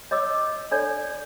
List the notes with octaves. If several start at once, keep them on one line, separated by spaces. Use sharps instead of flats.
C#5 D#5 D6 E6
D4 A4 C#5 D5